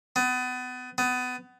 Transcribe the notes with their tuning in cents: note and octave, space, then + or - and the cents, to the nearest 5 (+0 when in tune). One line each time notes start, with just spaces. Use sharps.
B3 +30
B3 +25